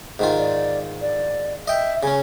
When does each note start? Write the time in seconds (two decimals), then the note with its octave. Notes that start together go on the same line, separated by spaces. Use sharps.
0.19 G#2 D#3 F4
0.38 D5
1.01 D5
1.67 D#5 E5 G5
2.03 C#3 C#4 G#5